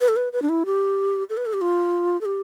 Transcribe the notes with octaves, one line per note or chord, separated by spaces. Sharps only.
B4
A4
B4
B4
D4
E4
G4
A4
B4
A4
G4
F4
A4
G4